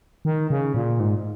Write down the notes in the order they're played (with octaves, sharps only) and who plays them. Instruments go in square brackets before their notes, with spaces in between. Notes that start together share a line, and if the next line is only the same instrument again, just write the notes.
[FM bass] D#3
C#3
A#2
G#2